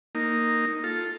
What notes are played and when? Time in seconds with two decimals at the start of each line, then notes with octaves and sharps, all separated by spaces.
0.15 A#3 D#4
0.84 F4 A4